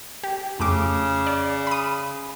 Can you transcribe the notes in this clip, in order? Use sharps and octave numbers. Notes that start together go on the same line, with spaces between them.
G4
F2 C#3 A3 D6
D5
B5 D#6